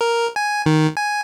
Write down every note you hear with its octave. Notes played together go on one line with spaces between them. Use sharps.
A#4
G#5
D#3
G#5